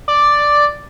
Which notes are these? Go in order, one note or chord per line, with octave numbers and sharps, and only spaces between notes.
D5